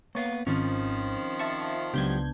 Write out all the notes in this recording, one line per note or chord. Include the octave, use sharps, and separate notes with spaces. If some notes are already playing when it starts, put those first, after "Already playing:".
A#3 B3 C#5 F5
G#1 D#3 F3 C4 C#4 F4
E5 A5 C#6
C#2 F#3 B3 D4 G4 G6 G#6